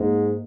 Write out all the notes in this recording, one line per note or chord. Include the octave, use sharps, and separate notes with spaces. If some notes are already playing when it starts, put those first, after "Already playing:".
Already playing: G#2 A#3